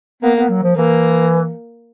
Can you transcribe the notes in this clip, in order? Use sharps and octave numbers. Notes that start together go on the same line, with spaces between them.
A#3 B3
B3
F#3
F3
E3 A#3